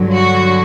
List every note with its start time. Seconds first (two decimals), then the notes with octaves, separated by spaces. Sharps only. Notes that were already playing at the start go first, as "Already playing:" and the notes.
Already playing: G2 D3 F#3
0.13 F#4